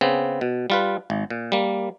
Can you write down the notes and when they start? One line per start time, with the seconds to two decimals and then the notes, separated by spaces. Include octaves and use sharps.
0.01 C#3 B3 C4
0.41 B2
0.70 G3 F4 B4
1.10 G#1
1.30 A#2
1.52 G3 A#3